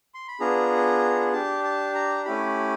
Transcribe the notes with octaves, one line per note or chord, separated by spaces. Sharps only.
C6
B5
B3 D4 F4 G#4 A#5
D4 G4 A5
A5
A#5
A3 C#4 E4 G4 B5